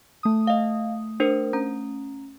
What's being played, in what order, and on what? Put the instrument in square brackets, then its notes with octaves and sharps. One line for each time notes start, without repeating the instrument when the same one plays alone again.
[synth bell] A3 D#6
[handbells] D#5 F5
D4 A#4 C5
C#4 A#5